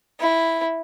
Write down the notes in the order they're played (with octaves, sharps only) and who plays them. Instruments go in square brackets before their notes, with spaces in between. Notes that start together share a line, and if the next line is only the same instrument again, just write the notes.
[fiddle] E4